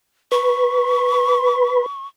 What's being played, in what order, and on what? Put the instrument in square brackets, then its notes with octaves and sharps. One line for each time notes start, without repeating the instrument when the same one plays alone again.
[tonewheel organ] B4 [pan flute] C#6